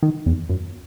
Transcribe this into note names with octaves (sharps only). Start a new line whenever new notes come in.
D#3
E2
F#2